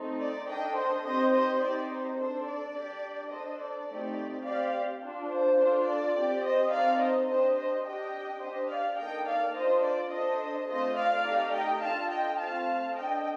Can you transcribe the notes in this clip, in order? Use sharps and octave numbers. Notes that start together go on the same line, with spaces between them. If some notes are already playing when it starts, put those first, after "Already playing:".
Already playing: A3 C4 D#4 A4
D5
D4 A4 D#5 G5
C5 D#5
C4 D#4 G4 C5 D#5
C5 D#5
C4 D#4 G4 D5
C5
D4 A4 C5
D5
D4 G4
D4 A4 C5 D#5
D5
A3 C4 D#4 G4
C4 G4 D5 F5
D4 F4 A4
C5
D4 F4 A4
D5
C4 G4
C5 D#5
C4 D#4 A4 D5 F5
C5 D#5
D4 G4 C5 D#5
C5 D#5
D4 G4 D#5 G5
D4 G4 C5 D#5
D5 F5
A#3 D#4 A4 D#5 G5
D5 F5
D4 F4 A4 C5 D#5
D5
D4 A4 C5 D#5
A3 C4 F4 C5 D#5
D5 F5
A3 D#4 G4
D#5 G5
D4 F4 A4 F5 A5
D#5 G5
A3 C4 F4 F5 A5
D4 A4 D#5 G5